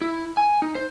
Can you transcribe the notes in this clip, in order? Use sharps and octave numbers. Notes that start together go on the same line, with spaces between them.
E4
G#5
D#4
C5